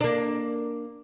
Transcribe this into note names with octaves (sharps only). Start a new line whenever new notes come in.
A#3 D4